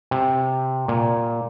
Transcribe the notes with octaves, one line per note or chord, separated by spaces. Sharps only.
C3
A#2